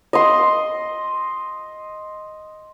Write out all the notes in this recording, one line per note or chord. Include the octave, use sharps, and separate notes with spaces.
D#5 C6